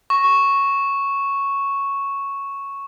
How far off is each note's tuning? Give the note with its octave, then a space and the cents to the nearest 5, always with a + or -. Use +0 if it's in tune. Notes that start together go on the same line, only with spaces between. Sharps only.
C#6 -5